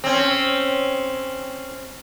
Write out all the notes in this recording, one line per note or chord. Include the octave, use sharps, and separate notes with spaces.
C4 C#4